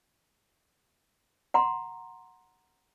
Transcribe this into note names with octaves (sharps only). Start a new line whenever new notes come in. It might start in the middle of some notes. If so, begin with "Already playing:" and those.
F#5 A#5 C6